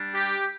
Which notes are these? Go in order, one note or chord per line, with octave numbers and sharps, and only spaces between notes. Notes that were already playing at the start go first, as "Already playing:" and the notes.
Already playing: G3 D4
G4